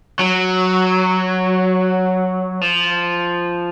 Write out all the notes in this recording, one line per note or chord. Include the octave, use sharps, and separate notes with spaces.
F#3
F3